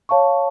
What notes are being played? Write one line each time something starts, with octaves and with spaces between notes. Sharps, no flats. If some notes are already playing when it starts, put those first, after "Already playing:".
C#5 F5 A5 C#6